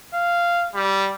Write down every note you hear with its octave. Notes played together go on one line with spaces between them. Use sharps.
F5
G3